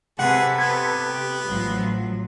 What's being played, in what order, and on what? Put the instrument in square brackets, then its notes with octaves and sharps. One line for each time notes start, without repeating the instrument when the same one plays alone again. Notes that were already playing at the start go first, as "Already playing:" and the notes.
[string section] C3 [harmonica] G#4 [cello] A4 B4 [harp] F#5
[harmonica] B3 [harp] G#6
[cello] G4
[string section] A1 F#3 [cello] F3